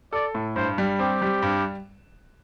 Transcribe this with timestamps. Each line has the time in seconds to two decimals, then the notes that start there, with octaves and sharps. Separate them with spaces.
0.13 A4 D5
0.35 A2
0.56 G2 C5
0.78 G3
0.99 C4 G4
1.22 G3
1.42 G2